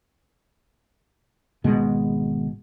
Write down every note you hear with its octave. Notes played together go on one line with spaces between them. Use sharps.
G#1 B2 G#3